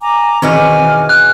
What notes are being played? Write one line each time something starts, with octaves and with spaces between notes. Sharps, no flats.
G#5 A#5 D6
E2 B2 D#3 C4 C#5 G#5 D6 F6
F6 F#6